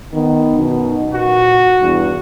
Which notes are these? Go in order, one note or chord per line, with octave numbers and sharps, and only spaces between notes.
D#3 B3
F#2 B2 D#4
A#2 F#4
E2 G2